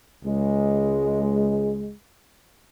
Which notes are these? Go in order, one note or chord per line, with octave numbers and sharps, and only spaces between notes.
C#2 G#3